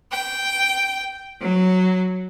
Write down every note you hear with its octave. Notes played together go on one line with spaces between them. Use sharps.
G5
F#3